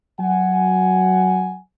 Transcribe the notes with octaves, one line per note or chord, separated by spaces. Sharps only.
F#3 F#5 G#5